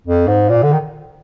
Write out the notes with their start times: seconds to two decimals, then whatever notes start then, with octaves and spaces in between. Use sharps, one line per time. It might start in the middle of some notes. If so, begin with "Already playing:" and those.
0.07 F2
0.27 G#2
0.49 A#2
0.63 D3
0.72 D#3